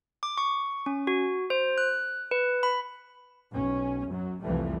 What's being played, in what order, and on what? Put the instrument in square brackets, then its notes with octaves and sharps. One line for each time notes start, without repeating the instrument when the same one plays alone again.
[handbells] D6
C#6
C#4
F#4
C5
F#6
B4
B5
[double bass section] B1 C#4
F#2 F#3
C2 F2 E3 F3 G3 A3